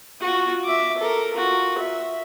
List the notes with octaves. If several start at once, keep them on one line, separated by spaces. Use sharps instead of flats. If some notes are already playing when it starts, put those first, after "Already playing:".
F4 F#4
E5 D6
A4 A#4
F4 F#4
E5